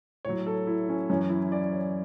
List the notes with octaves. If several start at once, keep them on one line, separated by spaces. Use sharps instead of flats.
A2 F#3 C#5
A4
E4
C#4
F#2 E3 C#4
E4
D5
C#5